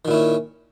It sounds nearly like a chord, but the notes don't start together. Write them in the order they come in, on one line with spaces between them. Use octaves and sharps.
D#3 A#2 E4 C#4